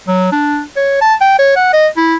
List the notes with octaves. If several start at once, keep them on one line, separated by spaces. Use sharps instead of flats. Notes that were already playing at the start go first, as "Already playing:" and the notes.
F#3
D4
C#5
A5
G5
C#5
F#5
D#5
E4